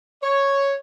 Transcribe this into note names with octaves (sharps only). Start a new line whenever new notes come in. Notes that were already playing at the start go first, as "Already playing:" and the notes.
C#5